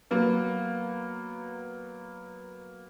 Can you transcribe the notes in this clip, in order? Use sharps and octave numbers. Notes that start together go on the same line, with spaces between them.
F#3 A#3 B3